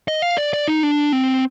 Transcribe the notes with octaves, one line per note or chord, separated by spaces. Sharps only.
D#5
F5
D5
D5
D#4
D4
C4